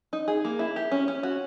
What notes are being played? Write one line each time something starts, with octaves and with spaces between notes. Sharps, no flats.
D#4
G#4
A#3
E4
G4
C#4
C#4
F#4